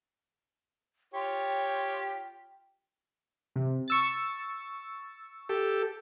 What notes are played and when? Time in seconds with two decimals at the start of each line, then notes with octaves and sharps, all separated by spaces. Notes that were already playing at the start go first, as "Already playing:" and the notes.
1.14 F4 G4 C#5 G5
3.56 C3
3.88 C#6 E6 A6
5.49 G4 A4